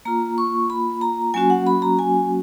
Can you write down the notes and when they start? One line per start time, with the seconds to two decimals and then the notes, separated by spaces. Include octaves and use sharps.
0.05 A#3 F4 A#5
0.38 C#6
0.70 B5
1.01 A#5
1.34 F#3 A#3 C#4 F#4 G#5
1.50 F#5
1.67 B5
1.82 A#5
1.99 G#5